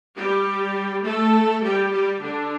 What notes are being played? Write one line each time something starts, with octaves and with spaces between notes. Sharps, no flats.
G3 G4
A3 A4
G3 G4
G3 G4
D3 D4